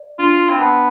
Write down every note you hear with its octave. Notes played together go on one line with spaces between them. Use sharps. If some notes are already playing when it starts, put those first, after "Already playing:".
Already playing: D5
D4 F4
C4
B3 A5